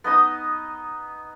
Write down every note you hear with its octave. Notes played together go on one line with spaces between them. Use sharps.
B3 D#4 D#5 D#6